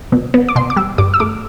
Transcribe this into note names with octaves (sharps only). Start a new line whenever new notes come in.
B2
B3
D6
B2 C6
D6
G3 E6
G2 D6
E6
A3 D6